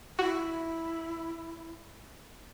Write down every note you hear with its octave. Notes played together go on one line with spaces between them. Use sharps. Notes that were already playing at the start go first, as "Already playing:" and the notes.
E4 F#4